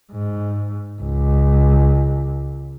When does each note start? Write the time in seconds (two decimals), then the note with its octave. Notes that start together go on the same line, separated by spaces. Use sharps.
0.12 G#2
1.02 C#2